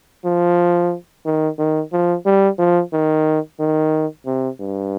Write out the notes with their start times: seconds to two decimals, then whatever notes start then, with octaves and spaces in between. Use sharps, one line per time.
0.25 F3
1.25 D#3
1.59 D#3
1.92 F3
2.26 G3
2.59 F3
2.93 D#3
3.60 D#3
4.26 C3
4.60 G2